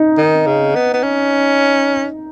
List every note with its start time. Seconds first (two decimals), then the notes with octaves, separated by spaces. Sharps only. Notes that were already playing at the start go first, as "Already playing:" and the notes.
Already playing: D#4
0.18 D#3
0.46 C#3
0.75 B3
0.94 B3
1.03 C#4